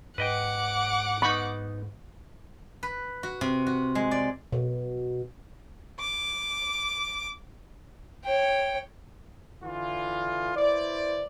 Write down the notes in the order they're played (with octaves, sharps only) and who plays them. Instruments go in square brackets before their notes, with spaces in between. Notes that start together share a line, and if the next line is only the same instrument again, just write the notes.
[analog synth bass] G#2 [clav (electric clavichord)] B4 D#5 G5 [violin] F#5 D6
[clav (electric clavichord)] B3 D#4 [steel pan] B5 C#6
[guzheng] B4
F#4
C3
F#4
G#3
D5
[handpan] B2
[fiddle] D6
[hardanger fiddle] C#5 G5
[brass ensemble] D3 E3 F4
E4 B4 C5 D5